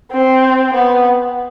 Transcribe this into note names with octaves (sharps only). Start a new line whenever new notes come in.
C4
B3